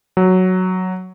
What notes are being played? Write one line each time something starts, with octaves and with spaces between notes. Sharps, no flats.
F#3